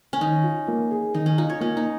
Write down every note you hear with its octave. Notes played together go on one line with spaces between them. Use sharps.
C#4
D#3 D#4
F4
A#3
G#4
D#3 D#4
C#4
D#4 F4
C#5
A#3 C#4
D#4